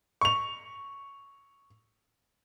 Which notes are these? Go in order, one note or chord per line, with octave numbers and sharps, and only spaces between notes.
C#6 F7